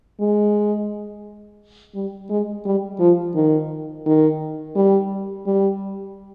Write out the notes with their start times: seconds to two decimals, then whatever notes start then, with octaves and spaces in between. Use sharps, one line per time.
0.20 G#3
1.95 G3
2.30 G#3
2.65 G3
3.00 F3
3.35 D#3
4.06 D#3
4.75 G3
5.46 G3